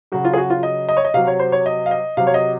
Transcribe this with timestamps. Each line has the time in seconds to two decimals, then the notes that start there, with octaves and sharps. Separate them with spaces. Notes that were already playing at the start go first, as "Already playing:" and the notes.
0.12 C#3 F#3 F#4
0.25 F4
0.33 G#4
0.38 F#4
0.50 F4
0.63 D#5
0.89 D#5
0.97 C#5
1.05 D#5
1.14 C3 F#3 F5
1.27 C#5
1.39 C5
1.52 C#5
1.66 D#5
1.86 F5
1.91 D#5
2.17 C3 F#3 F5
2.27 C#5
2.34 D#5